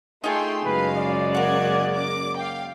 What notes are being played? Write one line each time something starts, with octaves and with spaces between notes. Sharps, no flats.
A3 D#4 F4 G#4 G5 C6
F#2 C#3 G#3 B4 F5
D5
A#3 F#4 F#6 G#6
D6
F5 G5